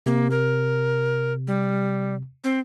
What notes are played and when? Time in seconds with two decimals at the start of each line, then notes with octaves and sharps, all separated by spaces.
0.06 C3 A#3
0.31 A#4
1.47 G3
2.44 C4